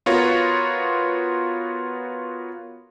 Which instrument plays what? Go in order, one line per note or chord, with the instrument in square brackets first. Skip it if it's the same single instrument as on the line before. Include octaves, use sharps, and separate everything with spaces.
[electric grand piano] B3 F4 F#4 A#4 C#5